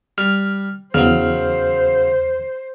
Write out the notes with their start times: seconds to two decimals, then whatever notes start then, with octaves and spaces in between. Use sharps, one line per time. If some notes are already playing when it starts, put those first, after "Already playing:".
0.18 G3 F6
0.94 E2 C#3 F#3 C5 F6